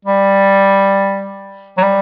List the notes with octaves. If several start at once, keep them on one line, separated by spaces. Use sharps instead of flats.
G3
F#3
G3